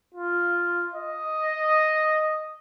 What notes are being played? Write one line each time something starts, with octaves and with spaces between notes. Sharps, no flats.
F4
D#5